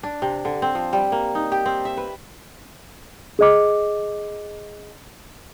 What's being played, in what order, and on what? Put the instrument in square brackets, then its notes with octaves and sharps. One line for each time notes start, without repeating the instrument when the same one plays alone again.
[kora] D4
C3
D3
C4
F3
G3
A#3
D#4
G4
C4
E5
B4
[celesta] G#4 D#5 D6